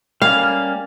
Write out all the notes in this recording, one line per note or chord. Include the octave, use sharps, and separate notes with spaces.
G3 A#3 C#4 F5